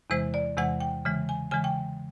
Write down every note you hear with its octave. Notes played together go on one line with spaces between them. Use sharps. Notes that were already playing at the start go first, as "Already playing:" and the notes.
E2 C3 E3 G#3 C5
D5
E2 C3 E3 G#3 F#5
G5
C#3 E3 G#3
G#5
C#3 E3 G#3 G#5
G5